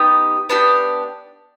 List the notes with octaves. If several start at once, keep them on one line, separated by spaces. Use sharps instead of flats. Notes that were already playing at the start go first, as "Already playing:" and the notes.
Already playing: B3 D#4 G4
B3 D4 G4